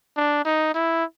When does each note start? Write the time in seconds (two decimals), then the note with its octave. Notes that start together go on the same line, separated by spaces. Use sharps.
0.17 D4
0.45 D#4
0.74 E4